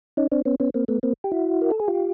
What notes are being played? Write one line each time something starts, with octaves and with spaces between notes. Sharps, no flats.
C#4 D#4
C4 D4
B3 C#4
B3 C#4
A#3 C4
A3 B3
A#3 C4
G4
E4 F#4
A#4
A4
G#4
F4 G4